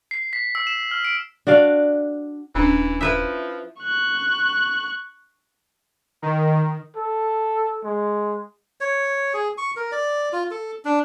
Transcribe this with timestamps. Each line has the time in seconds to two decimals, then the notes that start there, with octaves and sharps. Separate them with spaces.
0.11 C7
0.33 B6
0.55 E6
0.67 E7
0.91 F6
1.04 D7
1.47 D4 F#4 D5 F5
2.55 D#1 E3 C#4 D4
3.01 F3 E4 B4 E5
3.82 C#6 F#6
6.22 D#3
6.96 A4
7.84 G#3
8.81 C#5
9.34 G#4
9.58 C#6
9.76 A#4
9.92 D5
10.33 F4
10.51 A4
10.85 D4